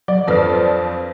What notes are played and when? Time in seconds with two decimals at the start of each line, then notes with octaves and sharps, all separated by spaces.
0.08 F#3 D5
0.28 F2 F3 D4 A4 B4 F6